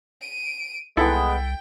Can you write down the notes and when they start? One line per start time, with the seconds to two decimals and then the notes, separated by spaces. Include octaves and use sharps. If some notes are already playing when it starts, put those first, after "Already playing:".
0.21 D7 D#7
0.97 C2 G#3 B3 E4 A4 E5 G5